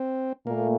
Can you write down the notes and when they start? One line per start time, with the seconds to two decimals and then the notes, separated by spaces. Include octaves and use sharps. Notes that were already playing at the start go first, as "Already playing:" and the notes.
Already playing: C4
0.47 A#2 A3 A#3